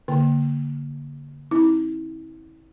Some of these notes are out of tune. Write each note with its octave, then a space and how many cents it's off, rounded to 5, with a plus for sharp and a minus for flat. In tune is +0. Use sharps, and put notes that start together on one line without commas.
D3 -35 A#3 +0 G5 +0
C4 +25 E4 -35